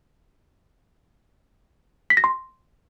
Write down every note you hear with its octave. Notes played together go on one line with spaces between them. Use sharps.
B6
A#6
C6